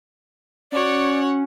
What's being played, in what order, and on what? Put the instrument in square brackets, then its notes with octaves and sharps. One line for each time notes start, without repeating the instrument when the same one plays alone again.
[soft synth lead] C#4 [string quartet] F#4 C#5 F#5 [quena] D5